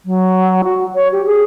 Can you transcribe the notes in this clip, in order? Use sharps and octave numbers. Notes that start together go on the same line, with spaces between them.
F#3
F#4
C#5
G4
G#4